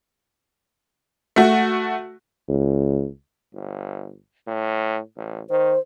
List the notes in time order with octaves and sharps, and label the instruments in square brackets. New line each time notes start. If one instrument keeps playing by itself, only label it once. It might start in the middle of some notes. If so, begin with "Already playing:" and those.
[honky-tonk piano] A3 F#4
[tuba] C#2
[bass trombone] G1
A2
A1
[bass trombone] D#3 [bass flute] C5